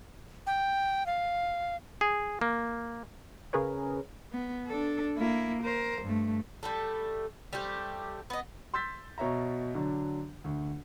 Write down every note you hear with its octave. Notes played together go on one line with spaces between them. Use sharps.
G5
F5
G#4
A#3
C#3 C#4 G#4 A#4 B4 C#5
B3
D4 A4
A#3 E4
A#4 C5
G2 A3
G3 A3 A4
G3 A3 C4 G4
B3 D#5
C6 E6 G6 A6 B6
B2 C#5 E5 A#5
D3 F#3 D4
D2